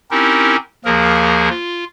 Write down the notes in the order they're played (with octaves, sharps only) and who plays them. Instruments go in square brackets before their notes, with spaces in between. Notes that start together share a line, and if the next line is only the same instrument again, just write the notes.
[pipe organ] C4 C#4 D#4 E4 G4 A#4
D#2 F3 A#3 G#4 A#4
F4